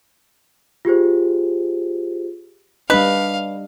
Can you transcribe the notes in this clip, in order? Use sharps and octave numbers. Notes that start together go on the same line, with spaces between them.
F4 G4 G#4 C5
G3 D4 B4 D#5 F5